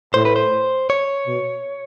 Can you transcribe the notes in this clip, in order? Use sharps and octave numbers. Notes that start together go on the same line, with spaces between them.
A2 C5
B4
C5
C#5
B2